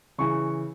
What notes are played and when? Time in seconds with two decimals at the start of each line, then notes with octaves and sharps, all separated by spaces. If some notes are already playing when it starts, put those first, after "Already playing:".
0.18 C#3 E3 C#6